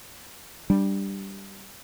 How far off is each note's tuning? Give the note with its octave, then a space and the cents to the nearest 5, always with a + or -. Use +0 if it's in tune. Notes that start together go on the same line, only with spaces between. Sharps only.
G3 +0 D4 +0